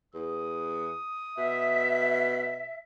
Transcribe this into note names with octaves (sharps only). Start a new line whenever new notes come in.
E2 D#6
B2 E5